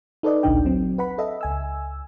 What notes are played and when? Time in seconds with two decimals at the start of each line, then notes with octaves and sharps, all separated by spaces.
0.23 D#4 A4 B4 D5 D#5
0.43 A1 D2 A#2 D4 D#4 G5
0.65 F#3 C4
0.98 B4 F#5 B5
1.18 A4 D#5 E5
1.41 C#2 G#5 E6